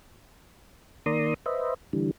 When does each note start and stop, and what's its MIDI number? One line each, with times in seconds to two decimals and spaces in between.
1.06 1.34 51
1.06 1.34 58
1.06 1.34 74
1.06 1.34 82
1.06 1.34 84
1.06 1.34 87
1.46 1.74 71
1.46 1.74 72
1.46 1.74 75
1.46 1.74 76
1.93 2.11 50
1.93 2.11 52
1.93 2.11 55